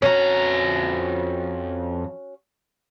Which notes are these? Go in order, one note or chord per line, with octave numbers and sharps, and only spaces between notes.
F2 C#4 F#4 A#5